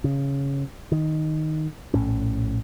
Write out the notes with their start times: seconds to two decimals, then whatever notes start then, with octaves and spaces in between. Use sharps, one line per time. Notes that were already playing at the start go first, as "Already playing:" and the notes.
0.04 C#3
0.92 D#3
1.94 A#1 A2 C#4